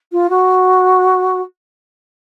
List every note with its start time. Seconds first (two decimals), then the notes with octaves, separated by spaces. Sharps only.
0.12 F4
0.30 F#4